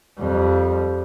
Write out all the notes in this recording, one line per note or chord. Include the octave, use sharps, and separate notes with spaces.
F2 G3